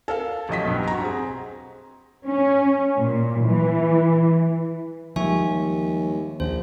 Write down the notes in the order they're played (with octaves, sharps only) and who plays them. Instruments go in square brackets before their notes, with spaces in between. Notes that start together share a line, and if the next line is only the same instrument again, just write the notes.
[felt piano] A4 A#4 F5
A1 F#3 D#5 B6
B1 G2
F#4 A#5
C4 G#4
[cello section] C#4
A#2
E3
[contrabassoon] D#2 [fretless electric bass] F3 G3 G#3 [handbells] E5 G#5 C#6
[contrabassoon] A#1 [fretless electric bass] D#2 [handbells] C5